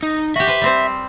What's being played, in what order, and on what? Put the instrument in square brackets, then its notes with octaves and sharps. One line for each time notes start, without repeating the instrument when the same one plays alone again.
[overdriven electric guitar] D#4
[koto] F#4 G4 [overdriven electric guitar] E5
[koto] B4 C5
G3 C4 C5